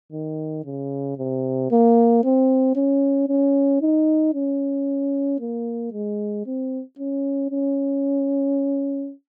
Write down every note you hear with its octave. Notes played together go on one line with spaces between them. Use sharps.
D#3
C#3
C3
A#3
C4
C#4
C#4
D#4
C#4
A#3
G#3
C4
C#4
C#4